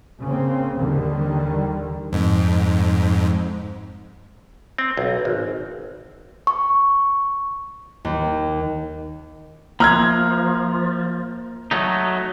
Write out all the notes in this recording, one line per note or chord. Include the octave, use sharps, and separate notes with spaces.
C#3 A#3 C4
D#2 D3 D#3 G3
F2 G#2
C4
B1
G#1
C#6
D#2
F3 A#3 A#5 F6 G#6
F#3 A3 D#4